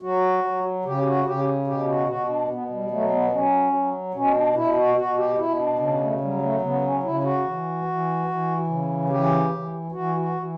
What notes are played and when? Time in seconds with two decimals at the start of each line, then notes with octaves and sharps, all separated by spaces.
0.02 F#3 F#4
0.44 F#3
0.85 C#3 G4
1.05 F#4
1.26 C#3 G4
1.67 B2 G4
1.88 F#4
2.08 B2 F#4
2.29 D4
2.49 B2 B3
2.70 G3
2.91 F#3 A3
3.12 B3
3.32 F#3 C#4
3.73 F#3
4.14 B2 C#4
4.35 D4
4.56 B2 E4
4.76 F#4
4.97 B2 F#4
5.17 G4
5.38 B2 E4
5.58 D4
5.79 C#3 D4
6.00 A3
6.20 F#3 G3
6.42 A3
6.61 C#3 B3
6.82 C#4
7.03 C#3 E4
7.24 F#4
7.44 E3
7.85 E3
8.27 E3
8.67 C#3
9.09 E3 G4
9.51 E3
9.92 E3 F#4
10.19 F#4
10.33 E3